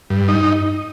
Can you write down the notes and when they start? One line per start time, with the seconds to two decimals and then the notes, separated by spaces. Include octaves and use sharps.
0.10 G2
0.28 D#4